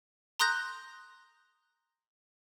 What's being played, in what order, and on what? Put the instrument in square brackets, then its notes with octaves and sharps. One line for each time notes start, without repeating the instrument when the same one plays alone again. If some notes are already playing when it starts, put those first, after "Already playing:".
[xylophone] A#5 C6 D#6 F#6 G6 A#6